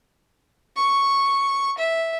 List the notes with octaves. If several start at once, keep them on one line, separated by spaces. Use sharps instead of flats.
C#6
E5